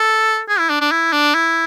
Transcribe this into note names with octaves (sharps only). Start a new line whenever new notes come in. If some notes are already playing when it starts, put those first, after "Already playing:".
Already playing: A4
G#4
E4
D4
D4
E4
D4
E4